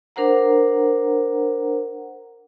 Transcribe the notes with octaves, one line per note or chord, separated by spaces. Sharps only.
D4 A#4 C5 F#5 A#5